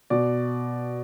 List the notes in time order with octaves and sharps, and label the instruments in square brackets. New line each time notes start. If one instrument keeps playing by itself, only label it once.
[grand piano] B2 D5